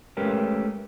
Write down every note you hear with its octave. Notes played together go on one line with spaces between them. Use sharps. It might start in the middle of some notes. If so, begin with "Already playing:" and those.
G#3 A3 C#4 G4 A#4 B4